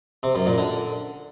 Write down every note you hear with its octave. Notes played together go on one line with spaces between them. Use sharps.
C3
F#2
A#2
D3